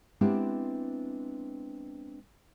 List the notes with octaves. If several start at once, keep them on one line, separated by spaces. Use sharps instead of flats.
G#3 B3 C4 D4 E4 G4